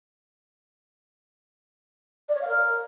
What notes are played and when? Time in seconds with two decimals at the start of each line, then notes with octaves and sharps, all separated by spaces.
2.28 D5
2.35 C#5
2.41 F5
2.47 A#4